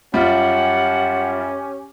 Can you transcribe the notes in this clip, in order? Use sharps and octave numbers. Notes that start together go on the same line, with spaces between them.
F#2 G3 C#4 F4 G4 F#5